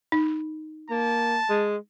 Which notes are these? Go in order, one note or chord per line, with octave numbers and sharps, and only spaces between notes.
D#4
A#3 A5
G#3